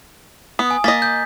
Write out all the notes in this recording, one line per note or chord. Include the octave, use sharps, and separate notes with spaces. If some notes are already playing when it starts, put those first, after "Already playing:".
B3 D#6
G#5
A#3 D#5 A6 B6
G6